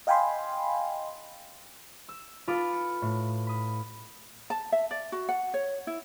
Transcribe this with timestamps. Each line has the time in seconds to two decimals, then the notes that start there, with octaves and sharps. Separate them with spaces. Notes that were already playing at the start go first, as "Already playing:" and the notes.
0.07 D#5 F5 G5 G#5 B5 C6
2.09 E6
2.48 F4 A4 B4 D6 D#6
2.73 C#7
3.02 A2
3.47 B5 D#6
4.50 A5
4.72 E5
4.91 D5
5.12 F#4
5.29 F#5
5.54 C#5
5.87 E4